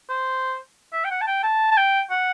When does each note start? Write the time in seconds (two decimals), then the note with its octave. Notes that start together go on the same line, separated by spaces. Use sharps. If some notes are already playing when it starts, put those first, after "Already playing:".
0.09 C5
0.93 E5
1.05 G5
1.11 F#5
1.21 A5
1.27 G5
1.43 A5
1.71 A5
1.77 G5
2.11 F#5